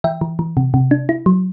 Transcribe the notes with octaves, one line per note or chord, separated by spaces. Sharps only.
E3 E5 G5
E3
E3
C3
C3
D4
E4
F#3